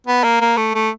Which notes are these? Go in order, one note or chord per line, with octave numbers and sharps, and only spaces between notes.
B3
A#3
A#3
A3
A3